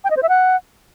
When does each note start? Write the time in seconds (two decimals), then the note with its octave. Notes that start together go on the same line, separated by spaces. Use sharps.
0.04 G5
0.10 D#5
0.17 C5
0.23 E5
0.29 F#5